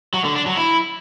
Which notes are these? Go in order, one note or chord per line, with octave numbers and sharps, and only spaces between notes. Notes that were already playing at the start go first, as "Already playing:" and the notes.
F#3
D3
D4
F#3
E4